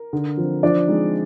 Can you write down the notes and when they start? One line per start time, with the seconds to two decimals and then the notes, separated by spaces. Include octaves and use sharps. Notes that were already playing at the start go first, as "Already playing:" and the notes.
Already playing: A#4
0.13 D3
0.37 F3 C4
0.63 F3 D4 D5
0.87 G#3 C4 D#4